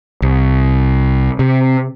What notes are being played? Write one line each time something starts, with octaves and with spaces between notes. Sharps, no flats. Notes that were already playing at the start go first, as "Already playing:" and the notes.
C2
C3